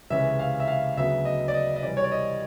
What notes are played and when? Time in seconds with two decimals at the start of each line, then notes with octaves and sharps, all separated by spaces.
0.10 C#2 C3 E3 G#3 C#4 E5
0.39 F5
0.60 E5
0.68 F5
0.97 D2 C#3 F#3 B3 E5
1.25 D#5
1.48 D5
1.54 D#5
1.76 D#5
1.83 C3 E3 G3 D5
1.97 C#5
2.04 D5
2.12 D#5